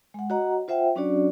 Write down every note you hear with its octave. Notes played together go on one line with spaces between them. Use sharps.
G#3 F#5
F#4 C#5 D#5 F#5 A#5
F4 C5 E5 F#5 G5
F#3 C#4 D4 F#4 C#5 D5